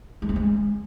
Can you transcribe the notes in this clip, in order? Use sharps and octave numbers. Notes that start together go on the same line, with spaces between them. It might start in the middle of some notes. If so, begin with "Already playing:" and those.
G#3
C4
G#3